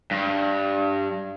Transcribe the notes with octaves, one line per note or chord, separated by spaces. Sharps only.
G2